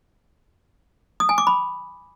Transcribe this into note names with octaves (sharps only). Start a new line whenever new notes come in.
D#6
G#5
D6
B5